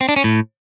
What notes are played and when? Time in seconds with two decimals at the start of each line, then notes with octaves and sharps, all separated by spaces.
0.01 C4
0.09 D4
0.16 C#4
0.24 A2